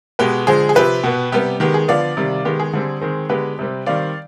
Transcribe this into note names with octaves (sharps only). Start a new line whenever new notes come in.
B2 G#3 B3 G4 B4
D3 F3 G#3 G#4 C5
G#4
C3 F3 C4 G4 B4
B2 B3
C3 G3 B3 G4
D#3 G#3 B3 G4
G#4
D3 F3 B3 D5 F5
C3 D#3 G3
D#3 G#3 B3 G4
G#4
D3 G3 C4
D#3 G#3 C4
D3 G#3 B3 G4 B4
C3 G3 C4
D#3 G3 C4 D5 F5